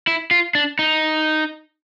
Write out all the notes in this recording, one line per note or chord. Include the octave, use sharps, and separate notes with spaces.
E4
F4
D4
D#4